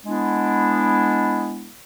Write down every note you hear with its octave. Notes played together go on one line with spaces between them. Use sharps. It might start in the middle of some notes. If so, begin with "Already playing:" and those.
G#3 B3 D4 E4